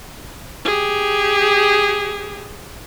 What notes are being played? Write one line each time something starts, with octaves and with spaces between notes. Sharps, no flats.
G4 G#4